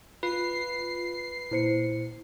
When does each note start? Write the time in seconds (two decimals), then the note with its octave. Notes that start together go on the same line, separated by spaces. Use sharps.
0.23 F4 B4 C7
1.51 A#2 E4 C5 C#7